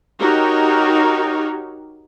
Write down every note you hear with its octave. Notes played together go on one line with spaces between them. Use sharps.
D#4 F#4 G4 A#4 C#5